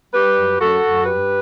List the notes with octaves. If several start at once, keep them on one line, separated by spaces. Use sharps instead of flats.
G3 G4 B4
F#2
F#2 F#4 A4
F#2
G2 G4 B4